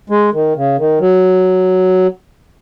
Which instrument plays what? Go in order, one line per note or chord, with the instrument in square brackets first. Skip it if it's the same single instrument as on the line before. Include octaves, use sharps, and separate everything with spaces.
[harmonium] G#3
D#3
C#3
D#3
F#3